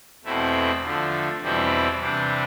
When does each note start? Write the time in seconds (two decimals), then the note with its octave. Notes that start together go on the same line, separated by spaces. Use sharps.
0.24 E2 B2 A3 C4 E4
0.82 D3 F3 A3
1.42 E2 B2 G3 C4 E4
2.00 C3 E3 G3 D4